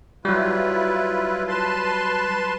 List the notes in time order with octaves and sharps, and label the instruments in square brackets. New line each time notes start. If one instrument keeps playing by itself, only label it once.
[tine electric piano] F#3 G3 [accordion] E4 F4 B4
[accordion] B4 A5 C6